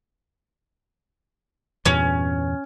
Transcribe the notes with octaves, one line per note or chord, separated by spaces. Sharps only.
E2 G2 A#2 C#4